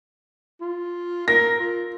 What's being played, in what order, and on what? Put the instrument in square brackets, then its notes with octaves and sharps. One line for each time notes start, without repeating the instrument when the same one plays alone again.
[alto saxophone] F4
[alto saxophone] A#4 [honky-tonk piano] A#6
[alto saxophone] F4